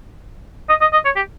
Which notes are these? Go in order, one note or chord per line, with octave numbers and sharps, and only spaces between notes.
D#5
D#5
D#5
C#5
G4